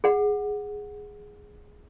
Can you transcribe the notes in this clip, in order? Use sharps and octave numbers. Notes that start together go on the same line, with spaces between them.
G#4 F#5